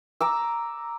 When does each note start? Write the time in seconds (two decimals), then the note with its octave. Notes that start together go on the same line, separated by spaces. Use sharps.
0.21 A#5 D6 E6